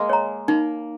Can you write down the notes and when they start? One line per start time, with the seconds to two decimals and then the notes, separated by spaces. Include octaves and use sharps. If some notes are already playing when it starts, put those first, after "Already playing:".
Already playing: G#3 A#3
0.09 C#5 A#5
0.48 A#3 D#4